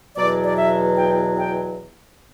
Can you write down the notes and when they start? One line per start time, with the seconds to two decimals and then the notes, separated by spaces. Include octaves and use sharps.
0.16 E2 B2 F#3 D5
0.46 D5
0.57 E5
0.97 G5
1.39 G5